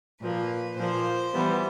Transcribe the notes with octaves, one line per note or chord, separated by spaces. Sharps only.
A#2 F3 A#3 B4
A#2 F3 A#3 C5
E3 G3 B3